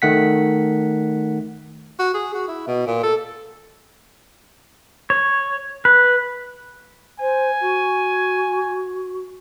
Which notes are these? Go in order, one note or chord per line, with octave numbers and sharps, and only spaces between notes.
D#3 A3 F#5 B6
F#4
G#4
F#4
E4
B2
A#2
A4
C#5
B4
C5 G#5
F#4